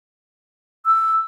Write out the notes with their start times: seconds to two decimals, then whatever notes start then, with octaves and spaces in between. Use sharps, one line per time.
0.86 E6